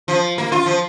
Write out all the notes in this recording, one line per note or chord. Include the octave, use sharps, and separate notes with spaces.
F3
A#3
F4
F3